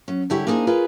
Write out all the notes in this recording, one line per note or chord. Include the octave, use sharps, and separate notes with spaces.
F#3 C#4
D3 G3 E4 G4 G#4 C#5
A#3 D4 D#4 G#4 C5 G#5
F4 G#4 A#4 B4